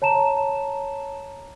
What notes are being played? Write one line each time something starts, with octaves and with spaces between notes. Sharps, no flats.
C#5 A5 A#5 E7